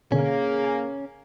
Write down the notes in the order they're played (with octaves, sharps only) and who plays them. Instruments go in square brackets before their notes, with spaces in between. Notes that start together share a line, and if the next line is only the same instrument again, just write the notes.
[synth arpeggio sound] B2 D3 [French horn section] A#3 [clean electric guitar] C#4 [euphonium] G#4
[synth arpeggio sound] G#5